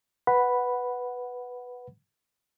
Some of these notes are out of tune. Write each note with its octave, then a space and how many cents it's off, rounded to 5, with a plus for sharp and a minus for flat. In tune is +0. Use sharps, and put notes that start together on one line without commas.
B4 +0 F#5 +0 B5 +0